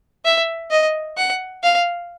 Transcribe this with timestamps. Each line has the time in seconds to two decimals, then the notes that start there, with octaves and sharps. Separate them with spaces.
0.25 E5
0.71 D#5
1.18 F#5
1.63 F5